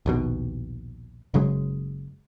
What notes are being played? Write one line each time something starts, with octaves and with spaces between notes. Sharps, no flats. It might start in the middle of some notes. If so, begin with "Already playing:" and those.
A#1 D#2 B2
F#1 C#3 F#3 G#3